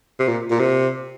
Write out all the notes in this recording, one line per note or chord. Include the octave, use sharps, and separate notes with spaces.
C3
A#2
A#2
C3